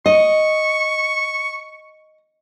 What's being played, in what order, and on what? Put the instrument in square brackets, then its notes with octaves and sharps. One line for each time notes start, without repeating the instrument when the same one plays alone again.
[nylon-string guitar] D#5 [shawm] C#6